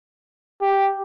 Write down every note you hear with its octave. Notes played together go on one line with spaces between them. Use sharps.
G4